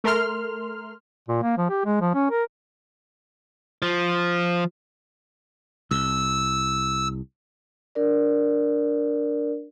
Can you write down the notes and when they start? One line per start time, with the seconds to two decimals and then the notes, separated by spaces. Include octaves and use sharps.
0.04 A3 A#4 C6 F6
1.28 A#2
1.43 A#3
1.57 F3
1.70 G4
1.85 G#3
2.01 F3
2.15 C#4
2.31 A#4
3.82 F3
5.91 C2 E6
7.95 D4 A#4 D5